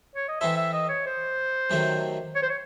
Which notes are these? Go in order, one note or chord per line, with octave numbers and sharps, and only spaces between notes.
C#5
D#5
E3 C4 E4 A4 C5 E5
E5
D#5
C#5
C5
C3 D#3 F#3 A3 C4
C#5
C5
C#5